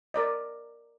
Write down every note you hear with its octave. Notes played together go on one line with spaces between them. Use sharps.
A#4 D5 D#5